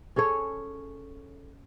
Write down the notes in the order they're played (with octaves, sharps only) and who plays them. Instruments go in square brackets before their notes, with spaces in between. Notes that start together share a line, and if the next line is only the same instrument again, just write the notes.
[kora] C#4 G#4 A4 C#5